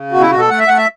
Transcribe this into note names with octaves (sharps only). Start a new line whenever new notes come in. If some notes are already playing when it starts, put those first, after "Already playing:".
Already playing: C#3
B2 F#4
E4
B2 F#4
A4
A3 F#5
E5
A3 F#5
E5